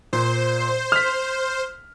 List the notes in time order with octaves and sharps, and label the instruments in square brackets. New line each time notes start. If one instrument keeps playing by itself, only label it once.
[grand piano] A#2 [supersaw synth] C5
[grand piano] F6 B6